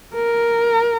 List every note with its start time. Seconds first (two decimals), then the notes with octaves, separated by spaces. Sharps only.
0.14 A#4